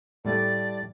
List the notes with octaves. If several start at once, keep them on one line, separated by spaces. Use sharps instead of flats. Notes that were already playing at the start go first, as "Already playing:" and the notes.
A2 G3 A3 D5